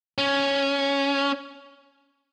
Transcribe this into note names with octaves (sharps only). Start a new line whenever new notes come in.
C#4